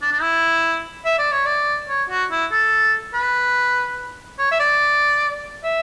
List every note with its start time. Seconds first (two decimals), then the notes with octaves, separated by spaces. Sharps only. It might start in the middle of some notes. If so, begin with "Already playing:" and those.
0.02 D4
0.12 D4
0.22 E4
1.05 E5
1.19 D5
1.32 C#5
1.45 D5
1.89 C#5
2.10 F#4
2.31 E4
2.52 A4
3.14 B4
4.39 C#5
4.51 E5
4.60 D5
5.64 E5